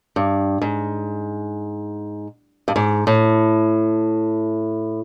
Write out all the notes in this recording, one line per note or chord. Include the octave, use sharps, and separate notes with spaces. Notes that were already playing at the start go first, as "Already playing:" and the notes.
G2
G#2
G2
G#2
A2